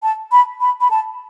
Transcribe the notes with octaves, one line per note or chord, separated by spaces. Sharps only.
A5
B5
B5
B5
A5